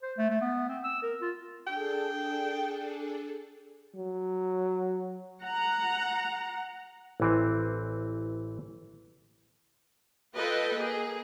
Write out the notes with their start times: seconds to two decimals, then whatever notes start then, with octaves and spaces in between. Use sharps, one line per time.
0.03 C5
0.18 A3
0.30 A3
0.41 B3
0.69 C4
0.84 E6
1.03 A#4
1.21 F4
1.67 D4 G#4 A4 G5
3.95 F#3
5.44 F#5 A#5
7.20 A1 E3 C4
10.36 F4 A4 B4 D#5 G5
10.77 A#3 G#4